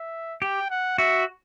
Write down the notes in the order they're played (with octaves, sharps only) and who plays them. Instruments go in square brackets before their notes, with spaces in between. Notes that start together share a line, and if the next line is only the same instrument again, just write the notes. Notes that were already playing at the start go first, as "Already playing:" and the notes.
Already playing: [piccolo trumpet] E5
[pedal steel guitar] G4 [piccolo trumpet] G5
[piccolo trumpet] F#5
[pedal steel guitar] F#4 [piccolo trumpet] E5